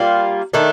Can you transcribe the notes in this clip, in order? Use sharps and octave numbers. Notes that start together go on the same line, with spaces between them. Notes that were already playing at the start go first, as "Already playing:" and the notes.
Already playing: G3 A#3 F4
D#3 A3 D4